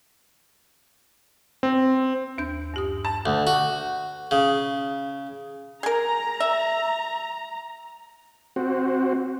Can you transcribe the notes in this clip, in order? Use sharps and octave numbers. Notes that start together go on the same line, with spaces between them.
C4
D#2 D4 G6
G2 G4 D#6
A5
D2
F#4
C#3
G#4 A#4 A#5
E5
C4 F#4